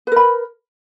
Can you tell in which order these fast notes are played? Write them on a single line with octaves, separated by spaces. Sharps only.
B4 A#4 B5